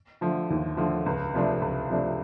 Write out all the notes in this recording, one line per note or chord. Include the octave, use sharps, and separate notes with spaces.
D3 F3 A3
D#2
D3 F3 A3
C#2
C3 F3 A3 D4
C#2
C3 F3 A3 D4